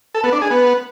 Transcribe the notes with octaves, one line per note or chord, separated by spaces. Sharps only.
A4
B3
D4
G#4
B3